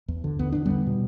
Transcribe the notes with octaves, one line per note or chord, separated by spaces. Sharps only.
E2
D3
E2 B3
D3 D4
E2 G3 B3
B2